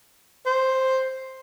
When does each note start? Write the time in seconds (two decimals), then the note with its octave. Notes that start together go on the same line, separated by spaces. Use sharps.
0.46 C5